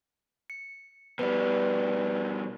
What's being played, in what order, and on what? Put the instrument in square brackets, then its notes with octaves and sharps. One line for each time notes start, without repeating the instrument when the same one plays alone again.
[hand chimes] C#7
[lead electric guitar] B2 G3 [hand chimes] B4 D5